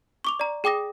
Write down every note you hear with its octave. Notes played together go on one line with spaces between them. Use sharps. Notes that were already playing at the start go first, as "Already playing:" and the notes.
C#6 D6 F7
D5 A#5
G#4 G5 D6 D#6 A#6